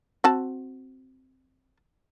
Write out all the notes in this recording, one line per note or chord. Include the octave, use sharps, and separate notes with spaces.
C4 F#4 A5